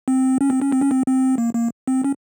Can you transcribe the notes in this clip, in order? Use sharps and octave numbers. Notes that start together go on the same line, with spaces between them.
C4
C#4
C4
C#4
C4
C#4
C4
C4
A#3
A#3
C4
C#4